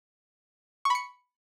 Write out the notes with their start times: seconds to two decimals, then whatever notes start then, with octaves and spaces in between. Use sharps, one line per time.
0.85 C#6
0.90 B5
0.95 C#7